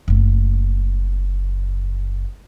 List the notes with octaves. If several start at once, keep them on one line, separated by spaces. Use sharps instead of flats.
F#1 A3